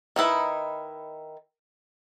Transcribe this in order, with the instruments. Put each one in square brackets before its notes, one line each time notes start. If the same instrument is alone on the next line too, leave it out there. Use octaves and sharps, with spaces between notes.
[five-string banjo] D#3 D#4 E4 B4